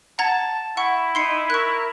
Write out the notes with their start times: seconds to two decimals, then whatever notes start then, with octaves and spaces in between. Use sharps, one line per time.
0.19 F#5 A5 A#5 G#6
0.77 E4 F#5 C#6
1.15 D#4 C6 C7 C#7
1.50 A#4 C#6 F#6